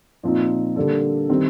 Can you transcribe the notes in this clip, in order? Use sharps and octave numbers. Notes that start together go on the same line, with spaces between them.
A#2 F3 C4 D#4
D3 G3 A#3 D4 A4
D#3 G3 C4